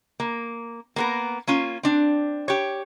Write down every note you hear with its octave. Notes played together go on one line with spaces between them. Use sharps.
A#3
A#3 B3 A#4
A#3 C#4 F4
C4 D4
G4 C#5